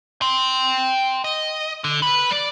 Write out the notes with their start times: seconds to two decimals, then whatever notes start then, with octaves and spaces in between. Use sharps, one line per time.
0.22 G5 C6
1.24 D#5
1.84 D3
2.02 B4 B5
2.31 D5